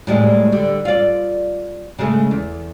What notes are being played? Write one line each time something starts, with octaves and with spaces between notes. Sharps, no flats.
A2 G3 G#3
D3 G3
F4 D5
C#3 G#3 A3
E2